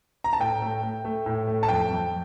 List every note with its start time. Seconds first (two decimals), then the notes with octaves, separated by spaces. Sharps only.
0.24 A#5
0.33 A5
0.40 A2 G5
0.62 A3
0.83 A3
1.05 A3
1.26 A2
1.47 A3
1.63 A5
1.69 F2 G5
1.90 F2